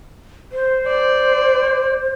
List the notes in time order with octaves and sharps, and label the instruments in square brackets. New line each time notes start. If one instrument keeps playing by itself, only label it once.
[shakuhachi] C5
[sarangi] D5